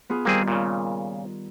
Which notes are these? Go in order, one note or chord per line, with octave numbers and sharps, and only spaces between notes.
B3 F4 G#4
D#3 G3 A#3 C4 G#4
A#2 C#3